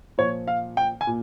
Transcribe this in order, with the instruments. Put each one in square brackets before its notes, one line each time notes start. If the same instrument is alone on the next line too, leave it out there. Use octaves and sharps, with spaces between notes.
[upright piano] A#2 F3 C#5
F5
G5
G#5
A#2